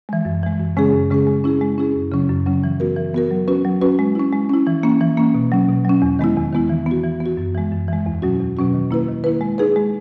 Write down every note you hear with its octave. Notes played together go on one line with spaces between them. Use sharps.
E3 G#3
F#2
E3 G#3
F#2
C#3 G#3 C#4 G#4
F#2
C#3 G#3 C#4 G#4
G#3
C#4 E4 G#4
G#3
C#4 E4 G#4
F#2
C#3 F#3 C#4
F#2
C#3 F#3 C#4
E3
B3 F#4 A#4
E3
B3 F#4 A#4
F#3
C#4 F#4 B4
F#3
C#4 F#4 B4
G#3
C#4 E4
G#3
C#4 E4
E3
A#3 C#4
E3
A#3 C#4
B2
F#3 C#4
B2
F#3 C#4
E2
D#3 G#3 B3 E4
E2
D#3 G#3 B3 E4
E3
B3 F#4
E3
B3
F#4
F#2
E3 G#3
F#2
E3 G#3
E2
B2 F#3 C#4 F#4
E2
B2 F#3 C#4 F#4
D#3
A#3 E4 B4
D#3
A#3 E4 B4
G#3
D#4 G#4 B4
G#3